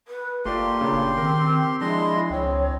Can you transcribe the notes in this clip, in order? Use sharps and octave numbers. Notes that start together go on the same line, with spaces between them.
B4
F#1 A3 A#3 F4 G4 D5 C6
A#2 C#3 D4
D#3 C4 A#4
F3 G#3 D4 E4 D#5 C6
C#2 C4 C#5